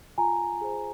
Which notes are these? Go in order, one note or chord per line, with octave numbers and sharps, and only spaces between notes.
F4 G#5 A#5
G#4 C5